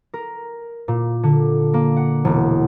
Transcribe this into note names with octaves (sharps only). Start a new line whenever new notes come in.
A#4
A#2
D3
A#3
F#5
E1